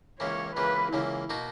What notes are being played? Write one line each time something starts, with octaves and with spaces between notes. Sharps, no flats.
C#2 C#3 E3 A#3 C#5
C#2 C#3 E3 A#3 B4
C#2 C#3 E3 A#3 E4
B2 A#3 D#4 F#4